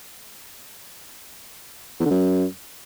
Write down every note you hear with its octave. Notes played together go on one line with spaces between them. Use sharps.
E2
D3
F#2